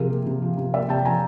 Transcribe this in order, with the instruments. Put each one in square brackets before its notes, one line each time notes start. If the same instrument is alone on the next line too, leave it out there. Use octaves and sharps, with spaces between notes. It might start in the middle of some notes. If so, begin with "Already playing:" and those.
Already playing: [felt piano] C3 F3 G#4 A#4
A#3
C3
F3
C3
A#3 D5 E5
C3 G5 A5
F3 G#5 A#5